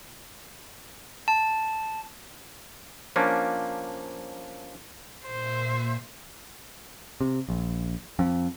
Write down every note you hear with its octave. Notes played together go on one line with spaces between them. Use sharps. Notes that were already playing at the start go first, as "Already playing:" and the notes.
A5
F3 A#3 C#4 D4
A#2 C5 E5
C3
A#1
F2